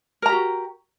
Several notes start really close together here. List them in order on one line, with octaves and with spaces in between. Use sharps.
A#4 A#5 G4 F#4